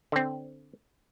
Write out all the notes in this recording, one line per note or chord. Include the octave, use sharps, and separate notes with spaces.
D3 C4